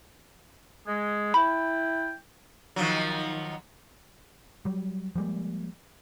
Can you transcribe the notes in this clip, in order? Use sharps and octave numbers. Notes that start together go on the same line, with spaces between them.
G#3
E4 G5 B5
D#3 F3 F#3
F#3 G3
F3 G3 G#3 A#3